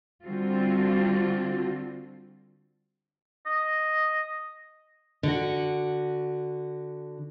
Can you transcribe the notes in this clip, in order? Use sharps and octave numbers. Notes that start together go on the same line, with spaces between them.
D3 G3 C4 F4 F#4
D#5
D3 F#4